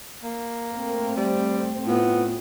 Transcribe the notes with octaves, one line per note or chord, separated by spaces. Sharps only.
A#3
A3 C4 A#4
G3 C5
A2 B3 F4